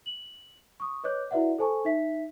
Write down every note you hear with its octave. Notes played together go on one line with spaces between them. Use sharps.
F#7
C#6 D#6
B4 C#5 D#5 D6 F#6 G6
E4 F#4 B4 D5 E5 F#5
A4 C5 G#5 A5 C#6
D#4 E5 B6